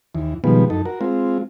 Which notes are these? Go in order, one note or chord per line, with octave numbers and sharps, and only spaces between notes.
D#2 E3
B2 D#3 F3 G3 G#3 B3
F#2 D#4 A4
F#4 A#4
G#3 C4 F4